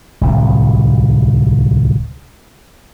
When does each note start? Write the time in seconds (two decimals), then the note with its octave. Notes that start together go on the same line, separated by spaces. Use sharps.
0.21 D1 C2